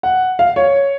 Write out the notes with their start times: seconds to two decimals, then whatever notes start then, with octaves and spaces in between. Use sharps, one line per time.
0.03 F#5
0.39 F5
0.56 C#5